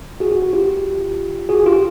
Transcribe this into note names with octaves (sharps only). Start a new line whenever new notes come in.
F#4 G#4
F#4
F#4
F4 G4
F#4 G#4
G#4
F4 G4